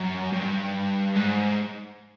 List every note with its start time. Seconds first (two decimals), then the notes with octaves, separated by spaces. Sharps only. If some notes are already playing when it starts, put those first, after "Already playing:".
Already playing: F#2
0.32 G2
1.16 G#2